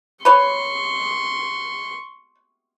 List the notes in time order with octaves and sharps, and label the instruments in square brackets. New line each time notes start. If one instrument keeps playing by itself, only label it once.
[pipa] B4 C#5 [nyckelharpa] C6 C#6